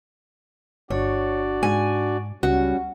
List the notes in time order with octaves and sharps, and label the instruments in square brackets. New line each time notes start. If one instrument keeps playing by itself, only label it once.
[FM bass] G1 [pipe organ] D4 F#4 D5 [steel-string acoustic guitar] C#5
[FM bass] G#2 [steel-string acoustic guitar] G#5
[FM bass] C#2 [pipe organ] G3 C#4 [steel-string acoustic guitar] F#4